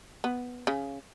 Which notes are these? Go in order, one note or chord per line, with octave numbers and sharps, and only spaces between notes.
B3
C#3